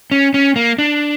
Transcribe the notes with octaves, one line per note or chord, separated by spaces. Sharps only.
C#4
C#4
A#3
D4